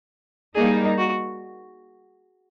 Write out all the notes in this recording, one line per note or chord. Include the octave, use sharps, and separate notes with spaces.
G3 A#3 D#4 G#4
F#4